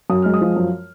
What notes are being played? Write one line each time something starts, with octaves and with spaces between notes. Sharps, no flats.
F#2 D#6
G#3 F6
D#6
F3
F#2